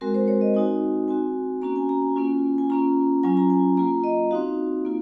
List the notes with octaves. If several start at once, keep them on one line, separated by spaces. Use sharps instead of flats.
G#3 C4 F#4 A#4
C5
C#5
D#5
C4 D#4 F#4 G#5
C4 F#4 G#5
A#3 C#4 F#4 A#5
G#5
A#5
G#5
A#3 C#4 F4
G#5
A#3 C#4 F4 A#5
F#3 C#4 F4 G#5
A#5
G#5
A#3 F4 A#5
D#5
C4 D#4 F#4 F5
A#3 F4